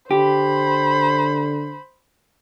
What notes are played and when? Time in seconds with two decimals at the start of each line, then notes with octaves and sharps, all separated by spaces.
0.11 D3 G4 C5 B5